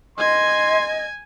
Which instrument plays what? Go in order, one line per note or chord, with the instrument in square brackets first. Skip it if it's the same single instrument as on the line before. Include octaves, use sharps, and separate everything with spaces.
[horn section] D#3 C6 [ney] D#5 [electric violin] G#5 G#6